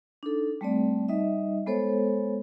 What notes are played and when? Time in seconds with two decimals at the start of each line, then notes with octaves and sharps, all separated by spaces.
0.23 D4 D#4 A4
0.61 G3 A3 C4 D5
1.08 G3 D#4 D#5 E5
1.66 G#3 B3 A4 C5 C#5